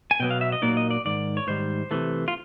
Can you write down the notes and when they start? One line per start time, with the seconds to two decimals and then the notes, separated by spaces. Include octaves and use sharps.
0.11 G#5
0.20 B2 F#3 B3 G5
0.30 F5
0.41 E5
0.52 D#5
0.62 A#2 F#3 A#3 D#4 D5
0.77 D#5
0.91 D5
1.05 G#2 D#3 D5
1.37 C#5
1.47 G#2 D#3 G3 C5
1.91 C3 E3 A3
2.28 F4